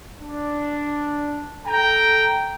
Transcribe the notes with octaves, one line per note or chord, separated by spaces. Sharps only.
D4
A4 G5 A#5